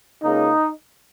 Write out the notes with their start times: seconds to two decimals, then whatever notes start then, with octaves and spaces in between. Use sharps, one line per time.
0.23 C#2 C#3 A#3 D#4